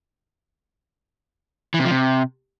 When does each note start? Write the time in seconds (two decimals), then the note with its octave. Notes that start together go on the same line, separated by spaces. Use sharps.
1.74 E3
1.80 C3
1.85 F3
1.91 C3